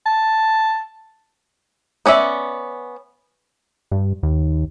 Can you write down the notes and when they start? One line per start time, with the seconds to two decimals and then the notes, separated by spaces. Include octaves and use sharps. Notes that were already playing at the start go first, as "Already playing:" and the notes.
0.06 A5
2.06 B3 C#4 D5 E5
3.91 G2
4.23 D#2